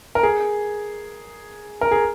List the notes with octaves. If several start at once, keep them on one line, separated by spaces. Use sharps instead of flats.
A#4
G#4
A#4
G#4